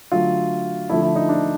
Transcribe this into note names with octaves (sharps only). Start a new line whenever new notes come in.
D3 F#3 A3 F4
D3 F3 A3 E4
E4
D#4
D4